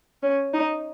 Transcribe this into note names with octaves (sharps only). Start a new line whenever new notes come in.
C#4
D#4